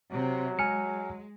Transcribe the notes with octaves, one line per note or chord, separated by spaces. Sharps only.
C3 F#3
G#3 G#5 F6 C#7